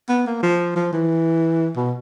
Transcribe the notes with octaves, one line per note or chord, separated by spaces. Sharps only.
B3
A#3
F3
F3
E3
B2